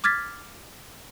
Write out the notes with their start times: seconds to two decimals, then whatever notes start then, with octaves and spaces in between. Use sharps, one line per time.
0.04 D6 F6 G#6 A6 B6